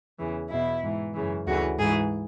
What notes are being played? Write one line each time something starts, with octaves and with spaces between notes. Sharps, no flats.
E2 C#3 E3
E2 B2 E4
G#2 E3
F#2 C#3 E3
D2 C#3 E3 F#4
G#2 E3 G#4